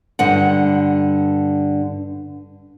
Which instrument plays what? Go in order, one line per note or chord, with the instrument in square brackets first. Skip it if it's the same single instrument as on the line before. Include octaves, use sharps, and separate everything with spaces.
[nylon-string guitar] G2 D3 F#5